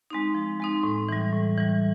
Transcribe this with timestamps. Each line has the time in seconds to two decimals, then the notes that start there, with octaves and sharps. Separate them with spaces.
0.10 G#3 C4 D#4
0.35 F3
0.60 G#3 C4 D#4
0.84 A2
1.09 E3 G3
1.33 A2
1.57 E3 G3